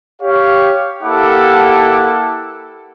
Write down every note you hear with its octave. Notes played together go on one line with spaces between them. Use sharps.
G4 C#5 F5
A#3 E4 G4 A4 F#5 D6